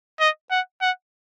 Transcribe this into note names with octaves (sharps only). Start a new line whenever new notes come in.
D#5
F#5
F#5